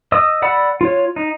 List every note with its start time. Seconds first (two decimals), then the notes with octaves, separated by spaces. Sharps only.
0.12 D#5 D#6 E6
0.42 D5 F#5 B5 E6
0.81 F4 C#5
1.16 D#4